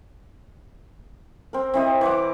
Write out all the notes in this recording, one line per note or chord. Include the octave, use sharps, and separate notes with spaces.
C4 A#4
C4 E4 D#5
E3 F#5 D6